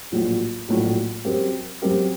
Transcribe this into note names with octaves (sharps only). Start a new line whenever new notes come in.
A#1 A2 F#3
A#1 A2 F#3
F#2 F#3 C4 G4 A#4
F#2 F#3 C4 G4 A#4